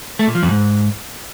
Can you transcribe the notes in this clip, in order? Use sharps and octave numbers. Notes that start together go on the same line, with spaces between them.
A3
A#2
F3
F2
G#2